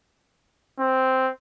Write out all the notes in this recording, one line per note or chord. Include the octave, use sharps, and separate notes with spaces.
C4